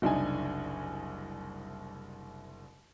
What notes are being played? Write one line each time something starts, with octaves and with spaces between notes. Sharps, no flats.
F#1 C2 D4 D#4 G#5